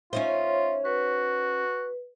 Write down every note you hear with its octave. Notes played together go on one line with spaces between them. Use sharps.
C#4 D#4 F4 C5 E5
F#4 B4